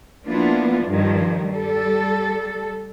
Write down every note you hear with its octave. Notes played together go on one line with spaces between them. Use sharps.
F3 A#3 B3 D4 E4 F4
G2 D#3 F3
G3 A4